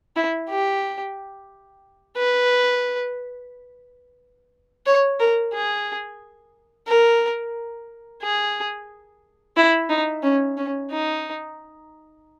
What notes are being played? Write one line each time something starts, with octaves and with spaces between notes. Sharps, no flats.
E4
G4
B4
C#5
A#4
G#4
A#4
G#4
E4
D#4
C#4
C#4
D#4